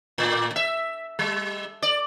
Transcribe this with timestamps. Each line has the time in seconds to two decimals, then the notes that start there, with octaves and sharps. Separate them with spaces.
0.18 A2
0.56 E5
1.19 G3
1.82 D5